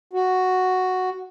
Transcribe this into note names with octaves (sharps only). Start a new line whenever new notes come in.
F#4